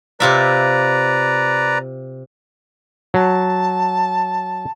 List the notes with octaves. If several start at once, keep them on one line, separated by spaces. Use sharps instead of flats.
C3 F4 B4 D5 E5 A#5
F#3 A5